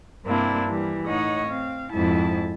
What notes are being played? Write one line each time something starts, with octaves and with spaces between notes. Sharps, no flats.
G2 C3 A#3 C4 D4 E4
E3 G3
A2 D#4 C#5 D#5 F#5
C4 F5
F2 G#2 E4 A5